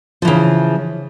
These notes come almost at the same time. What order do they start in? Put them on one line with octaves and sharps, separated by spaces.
F3 E3 C#3